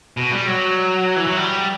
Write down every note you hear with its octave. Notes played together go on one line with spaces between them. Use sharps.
B2
G3
F#3
E3
F#3
G3